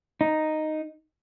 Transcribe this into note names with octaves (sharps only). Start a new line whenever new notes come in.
D#4